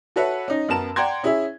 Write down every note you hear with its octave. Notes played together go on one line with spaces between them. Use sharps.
F#4 A4 B4 C#5 E5 F#5
C#4 D#4
F#2 B3 A#4 A5 E7
D5 F#5 G5 A#5 C6 G#6
C#4 E4 G#4 C#5 E5